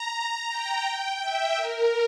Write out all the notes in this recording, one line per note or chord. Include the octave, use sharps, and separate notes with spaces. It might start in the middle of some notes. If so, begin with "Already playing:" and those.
Already playing: A#5
G5
G5
E5
A#4